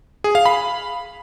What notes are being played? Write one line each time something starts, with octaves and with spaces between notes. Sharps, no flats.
G#4
F5
B5